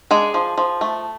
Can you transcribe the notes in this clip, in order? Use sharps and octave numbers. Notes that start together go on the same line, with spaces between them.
G#3 D4 G#4
F3
F3
A3